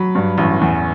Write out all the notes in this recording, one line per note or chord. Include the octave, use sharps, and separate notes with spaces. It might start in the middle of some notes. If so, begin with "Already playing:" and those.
Already playing: F#3 B5
G2
A1
E2